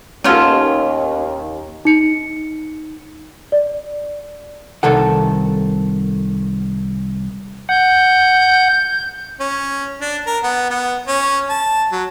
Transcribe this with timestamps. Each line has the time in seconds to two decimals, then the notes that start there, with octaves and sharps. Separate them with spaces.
0.24 D#2 C#3 B3 C#4 F4 A4
1.85 D#4 C#7
3.52 D5
4.83 C2 D#3 A4 F#5
7.69 F#5 G6
9.40 C#4
10.01 D4
10.27 A#4
10.43 B3
10.70 B3
11.08 C#4
11.50 A5
11.92 F#3